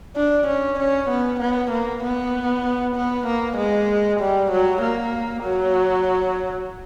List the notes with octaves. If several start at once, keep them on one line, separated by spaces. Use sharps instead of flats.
D4
C#4
C#4
B3
B3
A#3
B3
B3
A#3
G#3
G3
F#3
A#3
F#3